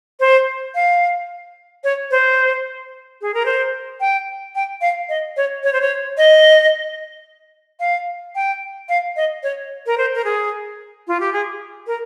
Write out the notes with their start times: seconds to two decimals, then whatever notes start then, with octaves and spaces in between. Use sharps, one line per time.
0.20 C5
0.75 F5
1.84 C#5
2.11 C5
3.21 G#4
3.34 A#4
3.46 C5
4.00 G5
4.55 G5
4.81 F5
5.09 D#5
5.37 C#5
5.64 C#5
5.73 C5
5.81 C#5
6.17 D#5
7.80 F5
8.35 G5
8.89 F5
9.16 D#5
9.43 C#5
9.86 A#4
9.98 C5
10.15 A#4
10.24 G#4
11.08 F4
11.20 G4
11.33 G#4
11.87 A#4